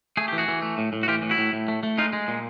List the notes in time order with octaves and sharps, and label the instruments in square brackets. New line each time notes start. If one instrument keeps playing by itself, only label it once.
[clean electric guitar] A3 G#4
E3 G4
F#4 G#4
E3
A3
A2
A2
F#4
E3 F4 G4
A2
E4 F#4
A2
A2
A3
A3
G#3 D#4 F4
G#3
A#2